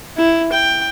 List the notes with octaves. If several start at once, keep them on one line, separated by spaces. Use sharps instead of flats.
E4
G5